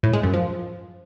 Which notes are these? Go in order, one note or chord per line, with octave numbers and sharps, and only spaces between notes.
A2
G#3
F#2
F3